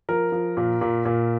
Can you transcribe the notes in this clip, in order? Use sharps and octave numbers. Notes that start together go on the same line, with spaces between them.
F3 A#4
F3
A#2
A#2
A#2